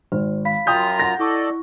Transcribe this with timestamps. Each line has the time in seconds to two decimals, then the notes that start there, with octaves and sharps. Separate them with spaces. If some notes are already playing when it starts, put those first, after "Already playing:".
0.12 G#1 C5
0.45 F5 B5 B6
0.67 F#2 F4 G5 A#5 D#6 G6
1.00 F#5 A#6
1.19 E4 A4 D5 D#5 C#6